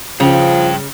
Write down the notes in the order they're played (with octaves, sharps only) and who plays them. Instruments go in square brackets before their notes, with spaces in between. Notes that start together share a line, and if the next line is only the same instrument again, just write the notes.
[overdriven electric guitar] G2 G5 [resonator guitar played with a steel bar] C#3 [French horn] F3